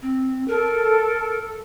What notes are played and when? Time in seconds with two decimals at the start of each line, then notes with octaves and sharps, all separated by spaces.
0.02 C4
0.48 A4 A#4